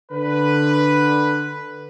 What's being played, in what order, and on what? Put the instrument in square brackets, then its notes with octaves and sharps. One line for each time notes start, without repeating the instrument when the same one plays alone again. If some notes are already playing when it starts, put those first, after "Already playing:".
[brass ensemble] D3 B4